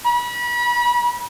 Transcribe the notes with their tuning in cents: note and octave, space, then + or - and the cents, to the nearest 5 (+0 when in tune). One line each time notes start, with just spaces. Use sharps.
B5 -35